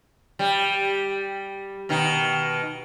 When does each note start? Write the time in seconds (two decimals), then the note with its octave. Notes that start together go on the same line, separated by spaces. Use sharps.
0.39 G3
1.89 B2 D#3 D#4